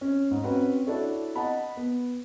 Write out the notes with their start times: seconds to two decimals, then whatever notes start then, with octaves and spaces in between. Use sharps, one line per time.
0.01 C#4
0.31 G#2
0.43 C4 C#4 F#4 B4
0.87 D4 E4 F#4 A4 C#5
1.35 D#5 F#5 A5 B5
1.77 B3